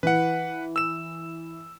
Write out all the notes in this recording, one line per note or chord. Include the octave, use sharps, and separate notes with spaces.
E3 B4 F#5
E6 E7